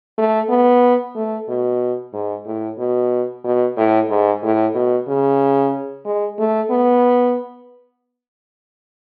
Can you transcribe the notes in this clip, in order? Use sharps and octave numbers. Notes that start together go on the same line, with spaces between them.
A3
B3
A3
B2
G#2
A2
B2
B2
A2
G#2
A2
B2
C#3
G#3
A3
B3